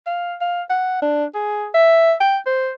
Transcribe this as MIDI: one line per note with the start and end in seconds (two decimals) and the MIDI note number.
0.06 0.36 77
0.41 0.62 77
0.70 1.00 78
1.02 1.25 62
1.34 1.67 68
1.74 2.13 76
2.21 2.37 79
2.46 2.71 72